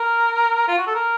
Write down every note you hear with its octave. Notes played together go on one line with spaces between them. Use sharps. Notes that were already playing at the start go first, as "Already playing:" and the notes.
Already playing: A#4
F4
F#4
A4
A#4